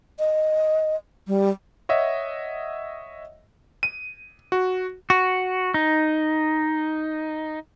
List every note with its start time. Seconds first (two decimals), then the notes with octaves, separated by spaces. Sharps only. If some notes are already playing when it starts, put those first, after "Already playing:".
0.19 D#5
1.27 G3
1.89 C#5 D#5 E5 F#5
3.83 D#7
4.52 F#4
5.10 F#4
5.74 D#4